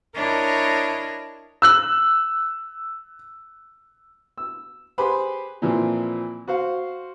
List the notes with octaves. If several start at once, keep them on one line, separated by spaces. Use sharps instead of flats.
D4 E4 A#4 C#5 D#5
E6 F#6 F#7
E6
G4 G#4 B4 C5 B5 C6
A#2 E3 F3 C4
F#4 C5 F5